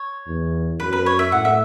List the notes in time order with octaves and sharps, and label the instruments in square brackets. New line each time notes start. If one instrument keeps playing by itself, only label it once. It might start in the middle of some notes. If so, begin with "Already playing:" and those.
Already playing: [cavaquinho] C#5
[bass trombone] E2
[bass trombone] F#2 [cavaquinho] B4
[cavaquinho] B4
C#5
E5
[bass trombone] A2 [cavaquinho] F#5
[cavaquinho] E5